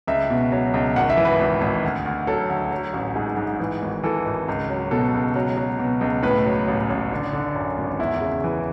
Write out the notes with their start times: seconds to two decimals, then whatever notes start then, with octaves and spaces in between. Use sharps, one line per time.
0.07 C#2 E5
0.30 B2
0.52 F#3
0.74 C#2
0.96 G#1 F#5
1.10 E5
1.17 E3
1.25 B4
1.39 G#1
1.61 G#1
1.83 D2
2.05 D2
2.27 F#3 A4
2.50 D2
2.71 F#3
2.94 A1
3.15 G#2 G#4
3.37 G#2
3.60 E3
3.82 G#1
4.03 E3 A4
4.26 G#1
4.48 C#2
4.70 F#3
4.91 B2 A4
5.14 C#2
5.35 F#3
5.57 F#3
5.79 B2
6.01 C#2
6.23 A2 B4
6.46 F#3
6.68 A1
6.90 A1
7.11 D3
7.33 D3
7.55 F#2
7.78 G#1
7.99 E2 E4
8.21 C#3
8.44 E3